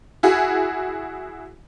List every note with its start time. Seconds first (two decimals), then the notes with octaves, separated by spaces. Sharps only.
0.23 E4 F#4 G#4